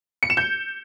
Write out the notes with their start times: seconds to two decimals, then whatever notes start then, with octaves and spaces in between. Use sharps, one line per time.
0.23 C#7
0.30 E7
0.37 G6